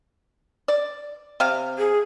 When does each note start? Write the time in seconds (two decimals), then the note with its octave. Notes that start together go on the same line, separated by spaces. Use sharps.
0.68 D5
1.40 C3 F5
1.78 G#4